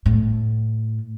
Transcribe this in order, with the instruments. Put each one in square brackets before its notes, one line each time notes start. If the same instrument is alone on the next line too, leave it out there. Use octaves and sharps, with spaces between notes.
[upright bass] A2